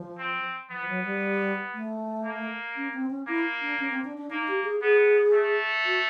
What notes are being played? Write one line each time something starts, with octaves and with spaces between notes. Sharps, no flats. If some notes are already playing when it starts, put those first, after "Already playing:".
Already playing: F3
C4
F3 B3
F#3
G3
A3
A#3
C#4
C4
C#4
A#3 E4
D4
C#4
C4
D4
D4
A#3 D#4
G4
G#4
B3 G#4
A3
F#4